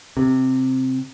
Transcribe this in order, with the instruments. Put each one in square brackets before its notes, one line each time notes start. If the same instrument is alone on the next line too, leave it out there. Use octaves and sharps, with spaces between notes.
[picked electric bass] C3